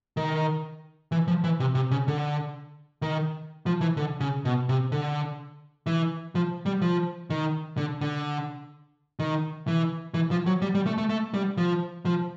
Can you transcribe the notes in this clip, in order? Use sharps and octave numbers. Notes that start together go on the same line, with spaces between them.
D#3
E3
F3
E3
C3
C3
C#3
D3
D#3
F3
E3
D3
C#3
B2
C3
D3
E3
F3
G3
F3
D#3
D3
D3
D#3
E3
E3
F3
F#3
G3
G3
A3
A3
A3
G3
F3
F3